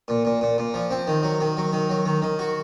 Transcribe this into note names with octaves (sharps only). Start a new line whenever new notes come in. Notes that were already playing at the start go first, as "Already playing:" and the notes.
A#2
A#2
A#2
A#2
F3
C4
D#3
F#3
D#3
F#3
D#3
F#3
D#3
D#3
F#4